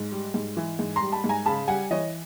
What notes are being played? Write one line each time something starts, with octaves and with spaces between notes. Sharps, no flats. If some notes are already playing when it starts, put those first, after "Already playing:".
Already playing: G#2
G3
G#2
E3
G#2
A#5 C6
G3
A5 B5
G#2
G#5 A#5
C#3 A5 B5
G3 F#5 G#5
E3 C#5 D#5